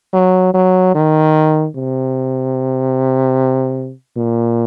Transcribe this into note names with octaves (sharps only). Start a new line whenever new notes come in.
F#3
F#3
D#3
C3
A#2